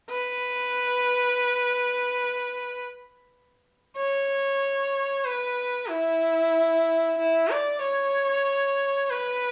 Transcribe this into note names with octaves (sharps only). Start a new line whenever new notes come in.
B4
C#5
B4
E4
E4
D5
C#5
B4